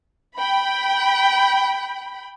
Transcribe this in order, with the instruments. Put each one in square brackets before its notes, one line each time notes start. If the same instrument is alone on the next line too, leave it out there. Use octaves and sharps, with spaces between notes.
[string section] G5 B5